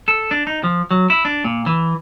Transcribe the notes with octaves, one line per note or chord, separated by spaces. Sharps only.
A4
D4
D#4
F3
F#3
E4
D4
A#2
E3